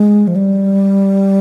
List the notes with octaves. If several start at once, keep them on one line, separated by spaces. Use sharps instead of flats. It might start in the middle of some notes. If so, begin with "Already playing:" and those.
Already playing: G#3
F3
G3